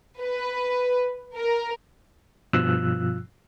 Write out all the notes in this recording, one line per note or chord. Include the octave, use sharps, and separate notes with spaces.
B4
A#4
G2 B2 F3 F4 E6 F#6